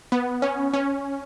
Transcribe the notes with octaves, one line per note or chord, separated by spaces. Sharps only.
B3
C#4
C#4